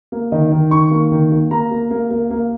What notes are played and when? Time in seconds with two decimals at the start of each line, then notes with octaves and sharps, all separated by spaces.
0.12 A#3
0.32 D#3 D#5
0.52 D#3
0.71 D#3 C#6
0.91 A#3
1.12 D#3
1.32 A#3
1.51 A#3 A#5
1.71 A#3
1.91 A#3
2.11 A#3
2.31 A#3